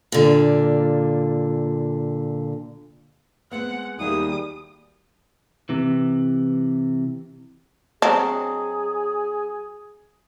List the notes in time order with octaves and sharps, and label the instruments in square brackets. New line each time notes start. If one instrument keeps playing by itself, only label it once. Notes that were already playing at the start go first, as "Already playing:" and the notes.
[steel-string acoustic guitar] A#2 D3
[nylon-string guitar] G#3 B3 C4 [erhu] F#5
[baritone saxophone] D#2 [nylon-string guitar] F#3 E4 G#4 [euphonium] G3 [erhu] D#6
[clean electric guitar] C3 E3
[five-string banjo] F#3 C4 D#5 [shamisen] D4 [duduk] G#4